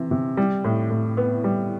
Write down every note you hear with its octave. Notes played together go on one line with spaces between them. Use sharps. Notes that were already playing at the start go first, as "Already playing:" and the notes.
Already playing: C3 E3
C3
G3
A2
A2
B3
G3